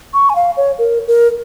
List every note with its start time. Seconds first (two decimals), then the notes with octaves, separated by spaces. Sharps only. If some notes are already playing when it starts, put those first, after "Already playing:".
0.14 C#6
0.30 G#5
0.36 F5
0.57 C#5
0.79 A#4
1.08 A#4